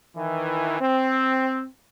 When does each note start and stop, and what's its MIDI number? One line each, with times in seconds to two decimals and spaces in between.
0.16 0.79 51
0.16 0.79 52
0.81 1.65 60